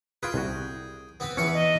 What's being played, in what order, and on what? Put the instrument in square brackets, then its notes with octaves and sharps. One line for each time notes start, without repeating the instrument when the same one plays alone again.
[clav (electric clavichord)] F4 B4 [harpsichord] G#4 G5
[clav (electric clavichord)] C2 F#4
[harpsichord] B3 C4 B4
[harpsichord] E2 B4 E5 [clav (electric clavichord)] E3 C#4 [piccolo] C#7
[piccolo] D#5